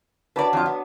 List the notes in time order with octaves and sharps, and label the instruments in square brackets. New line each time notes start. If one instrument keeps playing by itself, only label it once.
[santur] F#3 D4 A5 [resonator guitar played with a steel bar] B4 D5
[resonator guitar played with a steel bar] F2 F4
B3